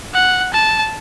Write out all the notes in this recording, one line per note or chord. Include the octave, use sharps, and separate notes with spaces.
F#5
A5